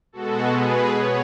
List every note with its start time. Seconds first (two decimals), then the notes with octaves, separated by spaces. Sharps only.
0.12 B2 G#3 B3 F#4 A4
0.52 G#4 B4
0.93 B2 B3 C#5